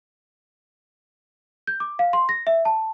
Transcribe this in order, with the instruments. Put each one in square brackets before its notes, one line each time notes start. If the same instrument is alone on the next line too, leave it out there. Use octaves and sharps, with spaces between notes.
[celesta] G6
D6
F5
C6
A#6
E5
A5